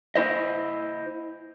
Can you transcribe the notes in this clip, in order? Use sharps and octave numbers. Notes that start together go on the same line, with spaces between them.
E4 C5 D#5